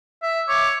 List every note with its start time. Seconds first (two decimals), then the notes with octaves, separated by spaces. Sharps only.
0.23 E5
0.48 C#5 D6